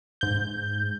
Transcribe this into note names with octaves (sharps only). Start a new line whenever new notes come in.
G#2 G6